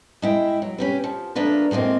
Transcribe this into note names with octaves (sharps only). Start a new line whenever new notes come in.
G#3 E4 G5
F#3
C#4 G4 B4
F3
F3 A3 A#3 D4 B4
A2 G3 G#3 A#3 C4